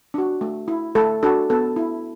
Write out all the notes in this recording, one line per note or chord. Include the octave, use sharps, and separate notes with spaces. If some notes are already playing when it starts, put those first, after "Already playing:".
D4 F#4
A3
E4
A3 A4
D4 F#4 A4
B3 A4
E4